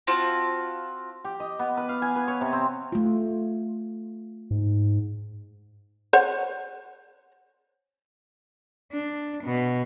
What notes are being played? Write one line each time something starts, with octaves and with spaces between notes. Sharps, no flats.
C4 F4 F#4 A5
G4
D#5
B3
B4
F5
G#5
B4
C#5
C3
C4
A3 F4
G#2
C5 C#5 F#5
D4
B2